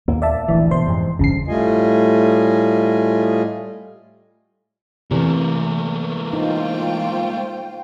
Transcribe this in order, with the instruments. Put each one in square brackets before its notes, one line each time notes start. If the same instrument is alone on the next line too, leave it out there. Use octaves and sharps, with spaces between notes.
[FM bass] D#2 [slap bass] A#2 A#3
[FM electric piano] D5 E5 A5
[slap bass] D1 A#1 A3 [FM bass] E3
[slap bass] B2 D#3 [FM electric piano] C5 C6
[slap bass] F2 G#2 C3
[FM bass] G1 [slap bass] E2 G2 [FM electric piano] C#3 C7
[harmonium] A2 G3 A3 F4 D#5 G#5
[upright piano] E2 [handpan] C3 [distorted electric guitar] A3 A#3
[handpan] D#4 [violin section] F4 C5 G5